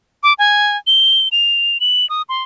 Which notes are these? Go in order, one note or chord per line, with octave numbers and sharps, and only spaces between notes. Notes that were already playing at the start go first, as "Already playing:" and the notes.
D6
G#5
G7
F7
F#7
D#6
C6